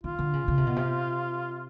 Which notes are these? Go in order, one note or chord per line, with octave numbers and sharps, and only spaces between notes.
D#3 F4
D3
C#3
C#3
C3
B2
C3